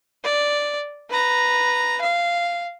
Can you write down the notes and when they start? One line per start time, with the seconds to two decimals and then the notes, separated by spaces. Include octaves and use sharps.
0.24 D5
1.10 B4 A#5
2.01 F5